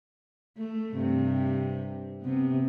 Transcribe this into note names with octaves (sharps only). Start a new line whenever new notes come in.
A3
G2 C3
C3 B3